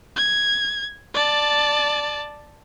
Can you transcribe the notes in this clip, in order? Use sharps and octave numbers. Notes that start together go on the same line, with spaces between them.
G#6
D5 A5